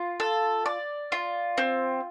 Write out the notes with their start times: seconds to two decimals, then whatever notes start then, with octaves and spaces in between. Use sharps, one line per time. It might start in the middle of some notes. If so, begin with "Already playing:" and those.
Already playing: F4
0.20 A4
0.66 D5
1.12 F4
1.58 C4